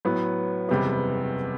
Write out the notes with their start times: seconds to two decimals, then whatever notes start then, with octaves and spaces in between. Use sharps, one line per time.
0.05 A2 F#3 B3
0.69 F#1 E2 C3 G3 B3